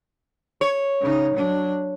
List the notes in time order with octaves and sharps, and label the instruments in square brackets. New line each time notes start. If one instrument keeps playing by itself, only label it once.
[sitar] C#5
[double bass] C#3 D#4
F#3 D4